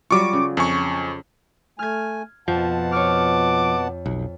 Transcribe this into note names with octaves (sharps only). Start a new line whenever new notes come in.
F#3 G3 F4 C#6 D6
C#3
F2 G#5 C#6
A3 G#5 F6 G#6
F2 B2 F3 F#5 A5
C#5 D6 F6
B1